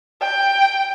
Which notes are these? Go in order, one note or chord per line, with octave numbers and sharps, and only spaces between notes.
G5